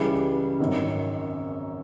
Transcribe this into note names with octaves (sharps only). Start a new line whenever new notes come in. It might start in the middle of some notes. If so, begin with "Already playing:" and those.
Already playing: C#2 C#3 E3 G3
G#1 F#2 D#3